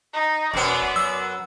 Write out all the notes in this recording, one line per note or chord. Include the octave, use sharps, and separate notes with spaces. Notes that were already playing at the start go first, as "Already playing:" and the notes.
D#4
E1 F#2 B3 D5
F#3 E6